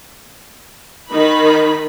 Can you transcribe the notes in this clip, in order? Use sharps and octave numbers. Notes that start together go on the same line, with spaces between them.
D#3 D#4 B5